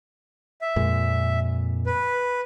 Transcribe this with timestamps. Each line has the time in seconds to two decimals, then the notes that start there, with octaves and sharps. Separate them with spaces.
0.61 E5
0.76 F2 A#2 G#3
1.86 B4